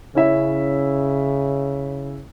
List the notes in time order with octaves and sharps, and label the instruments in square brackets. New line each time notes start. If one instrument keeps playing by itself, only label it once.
[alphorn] C#3 [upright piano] C#4 E4 E5